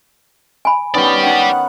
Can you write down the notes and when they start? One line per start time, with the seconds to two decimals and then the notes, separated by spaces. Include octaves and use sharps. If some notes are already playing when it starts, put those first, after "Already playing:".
0.65 G#5 B5
0.94 D#3 B3 C#4 G4 D5
1.23 D#4 F#5 G5